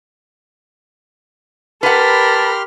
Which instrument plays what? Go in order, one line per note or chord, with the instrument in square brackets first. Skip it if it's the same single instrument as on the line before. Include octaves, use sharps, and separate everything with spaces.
[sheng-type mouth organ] G4 C6 F6 [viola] A#4 B5 [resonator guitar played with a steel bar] B4 F#5 [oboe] A5